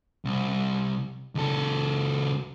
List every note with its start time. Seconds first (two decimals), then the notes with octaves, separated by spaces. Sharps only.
0.25 C2
1.35 C#2 A4